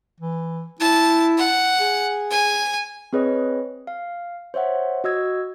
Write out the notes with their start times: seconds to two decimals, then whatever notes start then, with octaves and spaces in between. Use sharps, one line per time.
0.20 E3
0.80 E4 A5
1.38 F#5
1.80 G#4
2.31 G#5
3.13 C4 G#4 B4 C#5 D#5
3.87 F5
4.54 C5 C#5 E5 F#5
5.04 F#4 D#5 E6 G#6